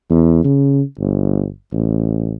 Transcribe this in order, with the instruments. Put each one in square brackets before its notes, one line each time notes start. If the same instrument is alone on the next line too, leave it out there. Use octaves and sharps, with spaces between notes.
[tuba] E2
C#3
G1
A1